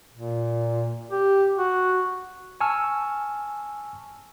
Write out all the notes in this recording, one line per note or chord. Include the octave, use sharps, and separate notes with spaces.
A#2
G4
F#4
G#5 A5 C#6 E6 F6